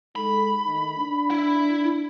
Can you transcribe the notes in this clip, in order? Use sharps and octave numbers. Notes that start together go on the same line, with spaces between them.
G#3 D#4 A4 B5
D#3 A3 D#4
D4
E4